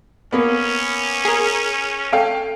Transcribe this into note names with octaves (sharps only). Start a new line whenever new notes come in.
A#3 B3 C#4
G#4 A#4
A4 F5 G5